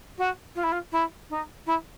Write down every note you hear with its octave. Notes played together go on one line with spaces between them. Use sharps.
F#4
F4
E4
F4
E4
D#4
E4